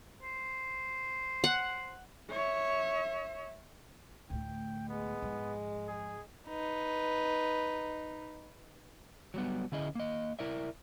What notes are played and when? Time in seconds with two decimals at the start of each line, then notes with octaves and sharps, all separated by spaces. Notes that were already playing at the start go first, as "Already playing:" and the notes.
0.23 C5
1.44 F#5
2.30 C#5 E5
4.30 D2 A2 G5
4.89 G#3 B3
5.22 G#2 F3
5.88 G#4
6.49 D#4 B4
9.34 F#3 G3 B3
9.72 D3 C#4 E4 G#4 D#5
9.95 A#3 D#5
10.39 E4 A#4 D5 E5